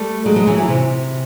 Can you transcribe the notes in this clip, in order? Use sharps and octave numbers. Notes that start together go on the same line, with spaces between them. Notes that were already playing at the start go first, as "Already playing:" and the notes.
Already playing: G3 A3
F#3 G#3
F#3 G#3
E3 F#3
E3 F#3
C3